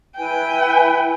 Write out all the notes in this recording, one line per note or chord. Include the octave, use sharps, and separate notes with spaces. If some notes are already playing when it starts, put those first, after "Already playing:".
E4 B4 G5 G#5